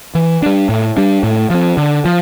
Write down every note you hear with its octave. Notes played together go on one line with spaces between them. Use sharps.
E3
G3 D4
A2
G3 D4
A2
F3 C4
D3
F3